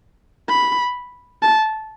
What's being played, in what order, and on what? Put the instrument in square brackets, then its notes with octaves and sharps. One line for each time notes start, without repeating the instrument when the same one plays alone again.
[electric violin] B5
A5